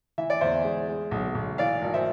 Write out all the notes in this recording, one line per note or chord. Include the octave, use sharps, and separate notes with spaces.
E3 E5
D5
E2 C5 E5
G#3
G#3
B1
B1
E3 D5 F5
G#1
C5 E5